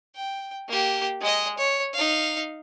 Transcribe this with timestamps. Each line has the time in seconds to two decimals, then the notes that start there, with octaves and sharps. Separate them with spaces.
0.16 G5
0.68 A#3 G4
1.21 G#3 D#5
1.58 C#5
1.93 D#4 F5